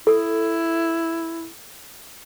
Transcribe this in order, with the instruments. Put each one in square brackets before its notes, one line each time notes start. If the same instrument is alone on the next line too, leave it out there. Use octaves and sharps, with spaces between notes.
[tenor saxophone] E4 [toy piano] A4